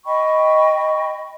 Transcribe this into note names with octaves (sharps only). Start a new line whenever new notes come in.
D#5 G5 B5 C#6